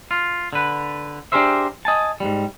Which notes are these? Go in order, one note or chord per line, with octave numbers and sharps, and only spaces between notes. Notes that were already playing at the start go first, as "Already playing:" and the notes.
F4
D3 B4
D4 G4 G#4 A#4 C5 E5
D#5 G#5 A5
G#2 C3 G3